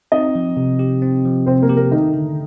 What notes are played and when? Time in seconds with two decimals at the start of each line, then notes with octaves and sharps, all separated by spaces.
0.12 C4 D#4 D#5
0.35 F3
0.57 C3
0.79 G4
1.02 C4
1.25 F3
1.46 C3 C4 C5
1.62 A#3 A#4
1.69 G4
1.77 A#3 A#4
1.91 D#3 A3 D#4
2.14 D3